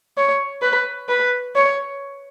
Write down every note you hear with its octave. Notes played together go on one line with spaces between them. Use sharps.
C#5
B4
B4
C#5